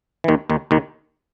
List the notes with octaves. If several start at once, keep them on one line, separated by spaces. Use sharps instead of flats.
E3
D#2 D#3
D#2 D#3
D#2 D#3